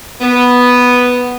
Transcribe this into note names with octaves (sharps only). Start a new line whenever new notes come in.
B3